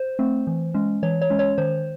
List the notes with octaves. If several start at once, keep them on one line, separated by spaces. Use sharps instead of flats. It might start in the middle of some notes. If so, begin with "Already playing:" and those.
Already playing: C5
A3 C4
E3
G#3 C#4
E3 C#5
C#5
G#3 C#4
C#5
D#3 C5